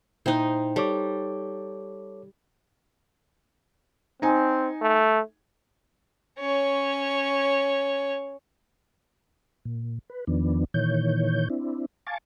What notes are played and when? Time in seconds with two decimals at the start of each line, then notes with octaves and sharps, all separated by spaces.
0.26 A#2 D#4 E4 C5 G5
0.76 G3 A4 C#5 D6
4.22 C4 D#4 G#5
4.82 A3
6.39 C#4 C#5
9.65 A#2
10.10 B4
10.27 E2 D#3 F3 B3 D4
10.74 A#2 D#3 E3 C#5 G6
11.50 C4 D4 E4
12.07 F5 G#5 A5 C#6 D6 A6